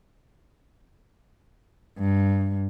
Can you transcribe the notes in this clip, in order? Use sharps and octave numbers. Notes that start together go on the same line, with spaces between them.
G2